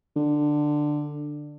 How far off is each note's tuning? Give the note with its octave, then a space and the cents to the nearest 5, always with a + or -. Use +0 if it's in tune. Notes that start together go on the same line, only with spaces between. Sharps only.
D3 +10